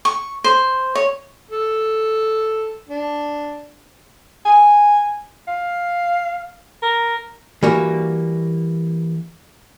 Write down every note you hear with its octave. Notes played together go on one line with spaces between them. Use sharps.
C#6
C5
C#5
A4
D4
G#5
F5
A#4
E3 G3 A#3 F#4